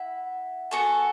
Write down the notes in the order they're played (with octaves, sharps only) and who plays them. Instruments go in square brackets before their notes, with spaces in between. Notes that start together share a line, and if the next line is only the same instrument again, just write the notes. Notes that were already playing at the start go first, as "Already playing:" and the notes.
Already playing: [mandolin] E4 E5 [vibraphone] F#5
[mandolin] B3 F#4 A4 [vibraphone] G#5